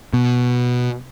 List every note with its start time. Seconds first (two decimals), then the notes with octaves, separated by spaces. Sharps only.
0.13 B2